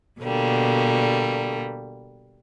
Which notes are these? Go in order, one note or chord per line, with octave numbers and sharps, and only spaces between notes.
B2 D3 G3 A#3